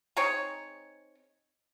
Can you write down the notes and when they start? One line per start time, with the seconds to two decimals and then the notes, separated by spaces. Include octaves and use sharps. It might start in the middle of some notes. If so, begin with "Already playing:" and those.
0.17 C4 D#4 G#4 C#5